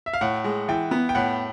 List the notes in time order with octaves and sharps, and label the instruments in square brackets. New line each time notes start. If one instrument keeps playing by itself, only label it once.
[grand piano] E5
F5
[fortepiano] A2 [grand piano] F#5
[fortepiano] G#3
[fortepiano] E3 [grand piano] G5
[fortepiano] B3
[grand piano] G5
[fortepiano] A2 [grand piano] F#5